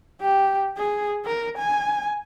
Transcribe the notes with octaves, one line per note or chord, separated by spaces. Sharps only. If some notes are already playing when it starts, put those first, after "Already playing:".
G4
G#4
A#4
G#5